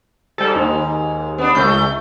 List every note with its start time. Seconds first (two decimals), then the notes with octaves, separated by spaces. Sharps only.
0.38 G#2 G3 A4
0.55 D#2
1.38 B3 D4
1.55 C#2 A3 G6